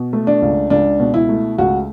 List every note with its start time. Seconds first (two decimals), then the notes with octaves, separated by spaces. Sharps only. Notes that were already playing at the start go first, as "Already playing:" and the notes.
Already playing: B2
0.13 A3
0.27 D4
0.42 C#2
0.70 C#2 D4
1.00 B2
1.14 E4
1.29 A3
1.58 C#2 F#4